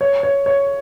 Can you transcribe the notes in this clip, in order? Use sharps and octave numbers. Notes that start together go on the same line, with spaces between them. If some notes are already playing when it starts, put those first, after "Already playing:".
C#5
C#5
C#5